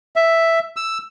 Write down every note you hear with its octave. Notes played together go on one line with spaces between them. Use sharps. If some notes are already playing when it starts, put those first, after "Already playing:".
E5
E6